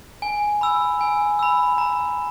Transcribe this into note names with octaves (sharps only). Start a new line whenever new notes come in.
G#5
B5 E6
G#5
B5 E6
A#5